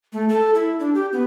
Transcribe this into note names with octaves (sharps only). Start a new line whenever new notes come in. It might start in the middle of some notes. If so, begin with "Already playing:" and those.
A3
A4
E4
D4
G4
B3